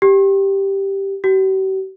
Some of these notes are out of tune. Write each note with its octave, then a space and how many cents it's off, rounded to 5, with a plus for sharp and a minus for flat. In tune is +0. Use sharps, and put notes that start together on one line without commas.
G4 +0
G4 -45